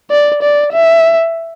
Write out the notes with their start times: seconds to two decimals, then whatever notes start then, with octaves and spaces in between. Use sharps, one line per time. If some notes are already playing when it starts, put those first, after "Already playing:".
0.11 D5
0.42 D5
0.73 E5